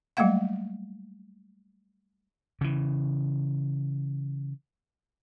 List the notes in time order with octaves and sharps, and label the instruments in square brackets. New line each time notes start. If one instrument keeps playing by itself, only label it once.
[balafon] F#3 G3 A3 A#3 F5 F#5
[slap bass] C#3 E3